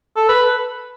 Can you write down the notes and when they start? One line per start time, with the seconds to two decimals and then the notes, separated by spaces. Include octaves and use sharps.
0.16 A4
0.29 B4